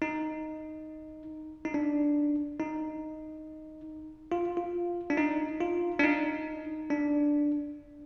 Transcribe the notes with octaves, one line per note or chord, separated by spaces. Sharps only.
D#4
D#4
D4
D#4
F4
F4
D4
D#4
F4
D4
D#4
D4